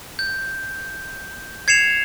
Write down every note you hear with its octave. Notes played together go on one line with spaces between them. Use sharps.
G6
G#6 C7 C#7 E7 F7